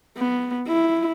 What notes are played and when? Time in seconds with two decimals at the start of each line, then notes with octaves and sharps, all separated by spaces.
0.17 B3
0.68 E4